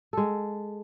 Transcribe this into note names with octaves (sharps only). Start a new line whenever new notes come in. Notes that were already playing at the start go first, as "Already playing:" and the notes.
G#3 A4